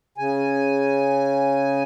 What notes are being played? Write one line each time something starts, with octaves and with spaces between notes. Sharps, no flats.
C#3 G#5